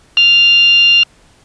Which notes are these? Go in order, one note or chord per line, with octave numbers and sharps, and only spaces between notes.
F6